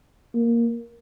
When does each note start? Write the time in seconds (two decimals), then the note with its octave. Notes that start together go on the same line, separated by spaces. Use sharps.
0.35 A#3